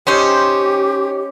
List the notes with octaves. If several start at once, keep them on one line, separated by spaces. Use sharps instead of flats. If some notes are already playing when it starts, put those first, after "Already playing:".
C#4 D#4 G4 C5 C6